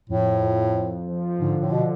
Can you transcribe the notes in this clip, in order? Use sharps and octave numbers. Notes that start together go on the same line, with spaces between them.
F2 A2
F2
F2
F3
G#2 D3
A2
B2 D3